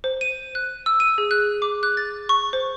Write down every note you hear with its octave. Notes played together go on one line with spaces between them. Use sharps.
C5
D#7
F#6
E6
D#7
G#4
F#6
D6
F#6
A6
C#6
C5